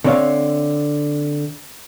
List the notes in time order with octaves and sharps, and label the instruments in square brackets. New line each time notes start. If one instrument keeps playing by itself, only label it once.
[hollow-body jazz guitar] D3 C4 C#5 D5 E5 F5